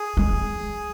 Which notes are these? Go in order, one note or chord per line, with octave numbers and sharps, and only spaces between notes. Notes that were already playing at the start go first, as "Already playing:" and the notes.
Already playing: G#4
G#3